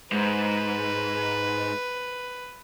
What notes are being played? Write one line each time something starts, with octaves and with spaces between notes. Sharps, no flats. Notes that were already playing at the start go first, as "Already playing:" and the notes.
G#2 B4